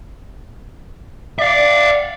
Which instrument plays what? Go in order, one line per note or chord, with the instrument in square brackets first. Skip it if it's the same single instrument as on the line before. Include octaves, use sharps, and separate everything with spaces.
[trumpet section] D5 [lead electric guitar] E5 F5